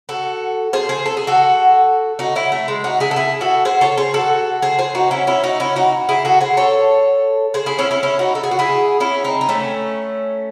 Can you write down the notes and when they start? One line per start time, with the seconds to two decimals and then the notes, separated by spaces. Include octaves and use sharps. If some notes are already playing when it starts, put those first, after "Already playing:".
0.09 F#4 A4
0.73 G#4 C5
0.89 G#4 C5
1.06 A4
1.17 G#4
1.27 F#4 A4
2.19 D#4 F#4
2.35 C#4 E4
2.52 A3
2.68 G#3
2.84 D#4 F#4
3.00 E4 G#4
3.11 A4
3.16 E4 G#4
3.41 F#4 A4
3.65 G#4 C5
3.81 A4 C#5
3.97 G#4 C5
4.14 F#4 A4
4.62 G#4 C5
4.79 G#4 C5
4.95 D#4 F#4
5.11 C#4 E4
5.27 C#4 E4
5.43 D#4 F#4
5.60 C#4 E4
5.76 D#4 F#4
6.09 E4 G#4
6.25 F#4 A4
6.41 G#4 C5
6.57 A4 C#5
7.54 G#4 C5
7.66 E4 G#4
7.79 C#4 E4
7.91 C#4 E4
8.03 C#4 E4
8.19 D#4 F#4
8.35 A4
8.43 G#4
8.51 F#4
8.59 E4 G#4
9.00 C#4 E4
9.24 C4 D#4
9.41 D#4
9.49 A3 C#4